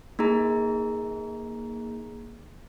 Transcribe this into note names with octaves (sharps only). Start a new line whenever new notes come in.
A#3 D#4 G#4 A#5